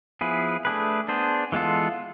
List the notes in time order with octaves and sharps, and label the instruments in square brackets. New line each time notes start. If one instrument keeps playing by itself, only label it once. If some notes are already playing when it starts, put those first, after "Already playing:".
[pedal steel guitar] F3 B3 E4 G#4 B4
A3 D4 G#4 B4
B3 D4 G#4 C5
E3 G#3 B3 F4 A4